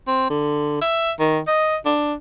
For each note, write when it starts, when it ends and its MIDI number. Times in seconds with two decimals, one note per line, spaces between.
0.07 0.27 60
0.30 0.79 50
0.81 1.11 76
1.19 1.39 51
1.47 1.76 75
1.85 2.13 62